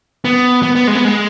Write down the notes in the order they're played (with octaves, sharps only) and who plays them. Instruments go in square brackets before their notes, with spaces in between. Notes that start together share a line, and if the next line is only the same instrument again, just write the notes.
[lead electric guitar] B3
B3
B3
G#3
B3
G#3